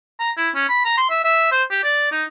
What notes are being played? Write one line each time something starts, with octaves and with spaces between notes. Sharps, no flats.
A#5
E4
C#4
B5
A#5
C6
E5
E5
C5
G4
D5
D#4